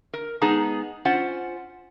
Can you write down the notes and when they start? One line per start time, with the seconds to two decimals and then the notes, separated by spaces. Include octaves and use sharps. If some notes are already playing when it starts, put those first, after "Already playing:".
0.13 A#4
0.42 G#3 B3 D#4 G#4 A5 A#5
1.05 C#4 F4 C5 F#5